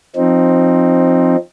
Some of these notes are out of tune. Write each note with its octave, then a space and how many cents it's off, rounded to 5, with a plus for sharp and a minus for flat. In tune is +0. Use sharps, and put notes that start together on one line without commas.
F3 +0 C4 +10 D#4 -5